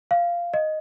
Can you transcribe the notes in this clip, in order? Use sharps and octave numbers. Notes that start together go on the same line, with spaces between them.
F5
D#5